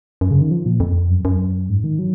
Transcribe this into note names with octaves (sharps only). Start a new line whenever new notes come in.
F#2
C#3
D#3
F3
A#2
F2
F#2
F#2
G#2
D#3
F#3